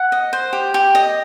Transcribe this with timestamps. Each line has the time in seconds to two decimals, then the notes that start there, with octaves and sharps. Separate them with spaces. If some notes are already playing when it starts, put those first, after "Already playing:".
Already playing: F#5
0.12 D#5
0.33 C5
0.53 G4
0.74 G4
0.95 D#5